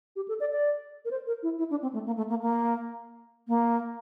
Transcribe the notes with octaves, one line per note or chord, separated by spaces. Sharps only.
G4
A4
D5
D5
A#4
C5
A#4
E4
E4
D4
C4
A3
A#3
A3
A#3
A#3
A#3